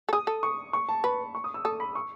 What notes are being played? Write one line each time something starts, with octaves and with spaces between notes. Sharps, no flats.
A4
G#4 D#6
A4
C#6
C#6
A5
B4 B5
C#6
D#6
E6
A4 D#6
B5
C#6